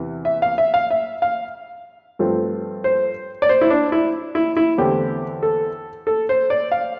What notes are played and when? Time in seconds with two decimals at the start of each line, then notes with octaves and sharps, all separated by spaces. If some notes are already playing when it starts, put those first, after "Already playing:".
Already playing: E2 C3 E3
0.25 E5
0.42 F5
0.58 E5
0.74 F5
0.91 E5
1.22 F5
2.19 G2 F3 A3 C4
2.84 C5
3.42 D5
3.49 C5
3.61 E4
3.70 D4
3.92 E4
4.35 E4
4.57 E4
4.78 E2 D3 A3 C4 G4
5.43 A4
6.07 A4
6.29 C5
6.50 D5
6.72 F5